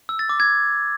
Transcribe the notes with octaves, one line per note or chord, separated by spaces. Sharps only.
E6
A6
D6
G#6